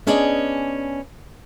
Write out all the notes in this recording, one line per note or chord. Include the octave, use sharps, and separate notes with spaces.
B3 C#4 D4 G#4 D5 D#5